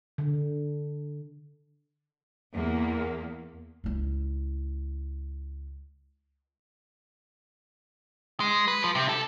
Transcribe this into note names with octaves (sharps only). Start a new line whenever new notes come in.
D3
E2 A#3
C#2 E4
G#3
B4
F3
C3
A4